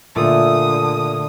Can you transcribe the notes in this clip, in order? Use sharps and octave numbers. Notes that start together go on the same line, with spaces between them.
A#2 D3 A3 D#6